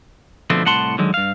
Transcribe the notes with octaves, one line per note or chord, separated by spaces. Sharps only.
B2 D3 F3 A3 C4
C2 A2 F#5 A5 C6
D3 D#3 F#3 G#3
G2 F5